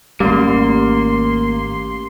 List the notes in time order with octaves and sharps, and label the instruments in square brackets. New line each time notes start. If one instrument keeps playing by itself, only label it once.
[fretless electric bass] G#1 G3 [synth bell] A3 C#4 G4 [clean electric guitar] A#3 [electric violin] C6